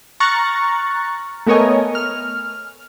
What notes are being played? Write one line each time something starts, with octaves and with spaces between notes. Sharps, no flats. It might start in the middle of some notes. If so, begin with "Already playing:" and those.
A#5 C#6 F6 F#6 A6
A3 B3 A#4 C#5 D#5 G#5
F6